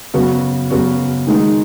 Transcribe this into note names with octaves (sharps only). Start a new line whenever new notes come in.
F#2 C#3 B3 F#4
F#2 C#3 B3 F#4
D#3 G#3 D#4